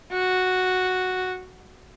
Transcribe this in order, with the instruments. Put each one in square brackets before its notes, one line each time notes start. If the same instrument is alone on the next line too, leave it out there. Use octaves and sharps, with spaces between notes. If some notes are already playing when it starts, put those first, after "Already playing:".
[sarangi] F#4